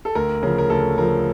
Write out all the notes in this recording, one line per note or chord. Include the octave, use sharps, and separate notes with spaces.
A4
D2 A#4
C#3 F3 A#4
A#4
D2 A4
C#3 F3 A#4